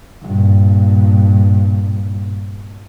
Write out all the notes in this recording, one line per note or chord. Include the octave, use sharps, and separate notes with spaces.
G2 A#2